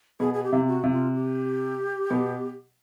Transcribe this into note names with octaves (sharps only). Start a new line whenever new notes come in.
B2 G#4
G#4
G4
C3
F#4
C3
F4
G4
B2